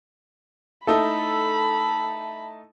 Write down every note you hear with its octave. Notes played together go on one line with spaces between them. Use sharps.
A3 D#4 E4 A4 A5 B5